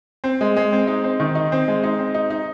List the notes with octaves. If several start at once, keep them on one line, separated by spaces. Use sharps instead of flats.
C4
G#3
G#3
C4
D#4
C4
D#3
D#4
C4
G#3
D#4
C4
D#4
D#4